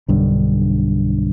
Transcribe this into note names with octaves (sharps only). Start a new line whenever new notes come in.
B1 G2 D3